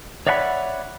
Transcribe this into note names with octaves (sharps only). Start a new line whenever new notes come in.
C#5 D5 E5 F#5 G5 B5